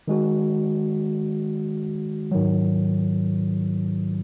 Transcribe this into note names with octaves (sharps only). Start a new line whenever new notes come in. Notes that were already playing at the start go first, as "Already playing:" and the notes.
D#3 G#3 F#4
G#2 D#3 F#3